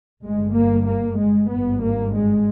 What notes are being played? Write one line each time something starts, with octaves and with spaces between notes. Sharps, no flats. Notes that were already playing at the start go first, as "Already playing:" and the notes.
G1 G2 G#3
A#3
A#3
G#3
G#1 G2 B3
A#3
G#3